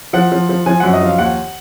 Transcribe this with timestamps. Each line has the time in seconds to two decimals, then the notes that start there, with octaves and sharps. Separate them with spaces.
0.13 F3 F#5
0.32 F3
0.49 F3
0.66 F3 G#5
0.80 F#2 F#5
0.93 D#5
1.02 F3 F5
1.18 D#2 F#5